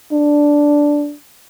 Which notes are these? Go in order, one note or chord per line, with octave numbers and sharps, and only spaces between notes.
D4